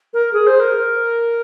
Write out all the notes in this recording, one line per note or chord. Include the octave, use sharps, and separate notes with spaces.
A#4
G#4
C5
A#4